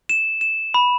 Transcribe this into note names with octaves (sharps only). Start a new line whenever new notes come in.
E7
E7
B5